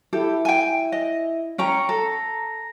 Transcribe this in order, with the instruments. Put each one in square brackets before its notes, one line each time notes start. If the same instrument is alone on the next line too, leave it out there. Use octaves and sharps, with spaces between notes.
[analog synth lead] E4 [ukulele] G4 A4
[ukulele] G5 G#5
D#5
[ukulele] C#4 G5 A#5 [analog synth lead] C#6
[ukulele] A4 [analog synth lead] A#5